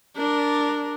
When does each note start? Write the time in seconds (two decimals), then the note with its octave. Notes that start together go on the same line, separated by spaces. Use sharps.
0.16 D4 A#4